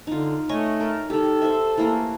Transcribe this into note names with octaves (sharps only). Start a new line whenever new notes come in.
D3 D#4 F4
A3 C#5 D#5 G#5
A#4
D#3 G4 A4
C5 E5
E3 A3 A#3